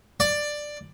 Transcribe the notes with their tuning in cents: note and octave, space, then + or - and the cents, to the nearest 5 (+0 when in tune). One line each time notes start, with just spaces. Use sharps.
D5 +10